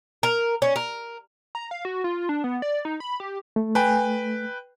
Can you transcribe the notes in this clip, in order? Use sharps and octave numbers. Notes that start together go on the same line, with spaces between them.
A#4
C#4
A#4
A#5
F5
F#4
F4
D4
B3
D5
D#4
B5
G4
A3
B4 G5 G#5